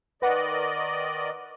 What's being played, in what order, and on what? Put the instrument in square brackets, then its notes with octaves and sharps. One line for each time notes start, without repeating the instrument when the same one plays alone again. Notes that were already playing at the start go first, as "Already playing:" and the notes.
[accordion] D#3 D5 D#5 [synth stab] B4 F#5